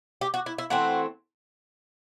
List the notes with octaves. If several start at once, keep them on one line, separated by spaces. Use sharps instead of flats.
G4
F#4
E4
E4
E3 A3 C4 F#4